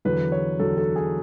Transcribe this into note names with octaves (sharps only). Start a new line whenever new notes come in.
E2 D3 F#3 B4
C#5
E2 D3 F#3 A4
A4
G#4